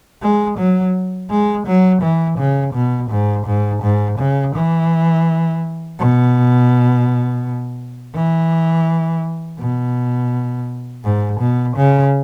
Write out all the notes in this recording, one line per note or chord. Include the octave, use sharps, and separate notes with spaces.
G#3
F#3
G#3
F#3
E3
C#3
B2
G#2
G#2
G#2
C#3
E3
B2
E3
B2
G#2
B2
C#3